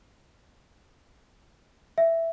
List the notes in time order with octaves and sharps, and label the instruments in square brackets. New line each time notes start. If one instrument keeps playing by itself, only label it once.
[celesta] E5